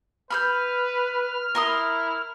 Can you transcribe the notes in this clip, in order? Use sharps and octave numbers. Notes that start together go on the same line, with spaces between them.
B4 B5 E6 F6 G6
E4 A#4 C6 D#6